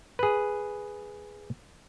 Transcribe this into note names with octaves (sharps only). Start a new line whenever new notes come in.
G#4 B4